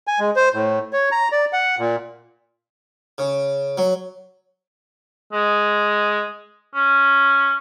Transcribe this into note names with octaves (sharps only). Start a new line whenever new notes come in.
G#5
G#3
C5
A2
C#5
A#5
D5
F#5
A#2
C#3
F#3
G#3
C#4